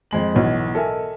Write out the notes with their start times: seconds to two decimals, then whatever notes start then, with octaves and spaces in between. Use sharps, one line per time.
0.11 F2 G#3 F#7
0.35 B1 B2 E3
0.75 A4 A#4 D#5 E5 G#5